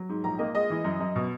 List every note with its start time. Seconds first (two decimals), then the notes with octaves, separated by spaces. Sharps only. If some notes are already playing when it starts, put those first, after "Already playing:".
Already playing: F#3
0.09 G#2
0.24 A#1 A#5
0.39 A#3 D#5
0.55 G#3 D#5
0.70 E3
0.84 F#2
1.00 F#2
1.16 B2